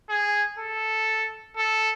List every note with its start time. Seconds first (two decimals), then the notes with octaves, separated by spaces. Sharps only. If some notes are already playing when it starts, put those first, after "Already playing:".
0.09 G#4
0.58 A4
1.57 A4